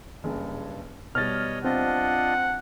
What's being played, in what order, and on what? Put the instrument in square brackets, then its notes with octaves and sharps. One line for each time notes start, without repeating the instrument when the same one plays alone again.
[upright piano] F#1 [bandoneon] G2
[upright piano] B2 G3 [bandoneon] C#5 D#5 [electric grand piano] F6 A6
[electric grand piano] C4 [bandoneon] D4 F4 D#5 [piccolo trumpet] F#5